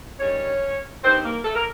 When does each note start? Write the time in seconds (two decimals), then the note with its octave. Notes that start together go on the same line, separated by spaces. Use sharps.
0.19 G2 D#3 G3 C#4 C#5
1.02 G2 D#3 G3 C4 C5
1.23 A#3 A#4
1.44 A3 A4
1.55 A#4